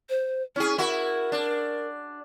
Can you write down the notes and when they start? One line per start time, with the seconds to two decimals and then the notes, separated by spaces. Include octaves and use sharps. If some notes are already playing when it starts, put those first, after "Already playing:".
0.09 C5
0.56 C#4 E4 G#4
0.78 E4 F#4 A#4
1.32 D4